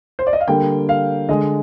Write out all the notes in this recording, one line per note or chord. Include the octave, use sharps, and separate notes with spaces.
C5
D5
D#5
F5
D3 G3 A#3 G5
F5
D3 G#3 D#5